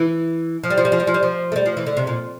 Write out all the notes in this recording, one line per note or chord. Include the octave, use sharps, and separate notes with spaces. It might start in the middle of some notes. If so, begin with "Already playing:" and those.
Already playing: E3
F3
G3
F3
G3
F3
G3
F3
G3
F3
A3
G3
F3
E3
D3
C3
A#2